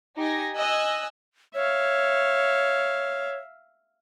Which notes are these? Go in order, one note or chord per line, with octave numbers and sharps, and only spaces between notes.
D#4 G4 G#5 A#6
D#5 G#5 E6 F#6
C#5 E5 F5